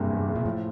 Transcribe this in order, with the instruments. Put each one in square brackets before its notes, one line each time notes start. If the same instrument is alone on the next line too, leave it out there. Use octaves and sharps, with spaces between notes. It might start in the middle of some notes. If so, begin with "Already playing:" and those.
Already playing: [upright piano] F#1 C3 A#3 [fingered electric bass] G2
[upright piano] E2
F#1
[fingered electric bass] A#2
[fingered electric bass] A2 [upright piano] F3